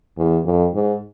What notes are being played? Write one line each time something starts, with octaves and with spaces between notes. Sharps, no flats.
E2
F2
G#2